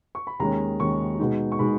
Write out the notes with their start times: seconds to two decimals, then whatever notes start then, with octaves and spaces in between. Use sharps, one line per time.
0.15 C#6
0.27 B5
0.39 D#2 D#3 G#3 C#4 A#5
0.80 D#2 D#3 G#3 C#4 C#6
1.19 B2 G#3 D#4
1.52 C#6
1.59 B2 G#3 D#4 B5